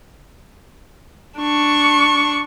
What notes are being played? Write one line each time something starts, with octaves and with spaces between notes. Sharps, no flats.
D4 C#6